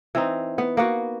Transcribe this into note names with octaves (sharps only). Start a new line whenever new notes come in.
E3 C4 D#4
B3
A#3 B3 F#4